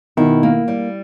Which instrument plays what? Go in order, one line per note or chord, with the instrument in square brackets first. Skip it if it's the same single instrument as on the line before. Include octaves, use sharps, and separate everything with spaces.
[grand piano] B2 D#3 [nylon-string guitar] E4
[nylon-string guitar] A#3
G3